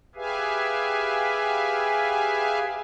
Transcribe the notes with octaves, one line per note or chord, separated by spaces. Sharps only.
G4 G#4 B4 E5 F5 G#5